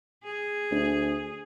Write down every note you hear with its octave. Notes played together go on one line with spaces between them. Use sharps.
G#4
D2